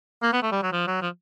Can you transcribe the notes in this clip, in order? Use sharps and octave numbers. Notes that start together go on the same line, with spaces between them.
A#3
B3
A3
G3
F#3
F3
F#3
F3